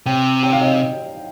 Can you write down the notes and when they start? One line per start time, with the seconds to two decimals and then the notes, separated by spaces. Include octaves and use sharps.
0.06 C3 G5
0.43 G5
0.53 F5
0.61 D#5